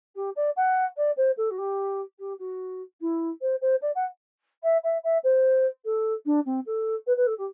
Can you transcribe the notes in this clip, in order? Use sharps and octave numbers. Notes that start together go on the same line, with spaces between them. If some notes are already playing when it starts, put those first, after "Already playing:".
G4
D5
F#5
D5
C5
A4
F#4
G4
G4
F#4
E4
C5
C5
D5
F#5
E5
E5
E5
C5
A4
D4
C4
A4
B4
B4
A4
G4